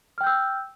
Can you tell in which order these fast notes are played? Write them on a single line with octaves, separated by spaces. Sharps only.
F6 G5 G6 E6